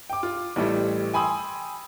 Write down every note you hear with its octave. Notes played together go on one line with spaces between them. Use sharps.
G5 D6
F4
A1 E3 G3 A3
G5 G#5 B5 C6 D#6 E6